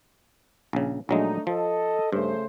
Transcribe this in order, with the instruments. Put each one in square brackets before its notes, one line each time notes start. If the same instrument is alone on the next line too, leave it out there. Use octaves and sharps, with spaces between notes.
[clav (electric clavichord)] A#1 C#3
[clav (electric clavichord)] A#1 F#3 G#3 [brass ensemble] A3 D4 D#4
[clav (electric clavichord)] F3 [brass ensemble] A4 D#5
[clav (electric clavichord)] G2 [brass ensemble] C#3 A3 C5